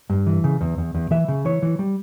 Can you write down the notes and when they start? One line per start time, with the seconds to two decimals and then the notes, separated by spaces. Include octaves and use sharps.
0.10 G2
0.26 E3
0.44 C#3
0.61 E2
0.78 E2
0.94 E2
1.11 E3 E5
1.28 C#3
1.45 E3 C#5
1.62 E3
1.79 G3